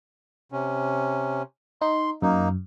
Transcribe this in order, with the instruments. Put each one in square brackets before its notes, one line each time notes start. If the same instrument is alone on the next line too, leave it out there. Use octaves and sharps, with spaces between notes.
[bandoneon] C3 C#4
[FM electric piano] D#4 [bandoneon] C6
[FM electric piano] F#2 [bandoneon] A#3 D#4